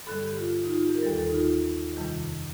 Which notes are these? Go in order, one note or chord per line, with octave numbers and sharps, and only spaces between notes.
G2 D3 G3 A4
G4
F4
D#4
F4
G4
A#4
D#2 D#3 G3 A4
A4
D#4
F4
F2 C3 D#3 G3